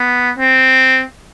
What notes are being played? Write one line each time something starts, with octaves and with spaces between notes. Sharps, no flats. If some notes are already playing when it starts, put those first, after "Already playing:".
Already playing: B3
C4